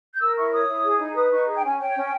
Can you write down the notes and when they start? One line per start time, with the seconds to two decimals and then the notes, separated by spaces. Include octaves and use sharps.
0.13 G6
0.20 A#4 E6
0.36 E4 C#6
0.51 C#5 D#6
0.68 E4
0.84 G#4
0.99 D#4
1.15 B4 D#6
1.32 D#4 C#6
1.47 G#4
1.55 G5
1.63 C#4 G#5
1.79 C#5 G5
1.95 C#4